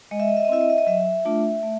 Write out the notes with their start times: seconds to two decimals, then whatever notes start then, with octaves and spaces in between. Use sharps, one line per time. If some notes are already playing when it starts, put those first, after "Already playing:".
0.11 G#3 D#5
0.20 E5
0.28 D#5
0.37 E5
0.45 D#5
0.49 C4 E4 E5
0.61 D#5
0.70 E5
0.78 D#5
0.87 F#3 E5
1.25 A3 D4 F4
1.63 A3